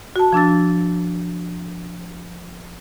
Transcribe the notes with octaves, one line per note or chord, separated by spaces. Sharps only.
F#4 A5
F3 D4 E6 A6